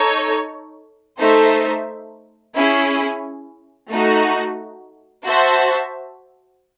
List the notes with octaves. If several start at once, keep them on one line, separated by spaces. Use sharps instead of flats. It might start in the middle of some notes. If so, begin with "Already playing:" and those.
Already playing: D#4 A4 C#5
A3 D#4 A4 C5 E5
C#4 E4 G#4
A3 D#4 F#4
F#4 C5 E5 A5